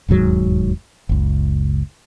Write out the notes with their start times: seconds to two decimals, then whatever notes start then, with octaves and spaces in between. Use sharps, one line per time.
0.09 E1 D#2 G#2 F#3
1.09 F#1 C#2